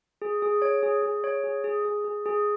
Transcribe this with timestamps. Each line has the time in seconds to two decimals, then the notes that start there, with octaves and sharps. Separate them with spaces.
0.22 G#4
0.42 G#4
0.62 C#5
0.83 G#4
1.02 G#4
1.24 C#5
1.44 G#4
1.64 G#4
1.85 G#4
2.05 G#4
2.26 G#4